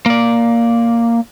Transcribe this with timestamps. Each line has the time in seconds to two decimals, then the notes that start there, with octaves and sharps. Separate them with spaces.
0.06 A#3 D5